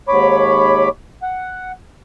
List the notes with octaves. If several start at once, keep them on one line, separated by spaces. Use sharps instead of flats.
D#2 G#2 C#5 B5 D6
F#5